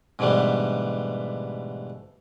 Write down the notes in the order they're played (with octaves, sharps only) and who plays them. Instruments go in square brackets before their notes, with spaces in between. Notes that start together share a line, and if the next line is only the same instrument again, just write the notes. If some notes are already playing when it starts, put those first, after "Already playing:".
[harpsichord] G#2 B2 D3 E3 G3 A3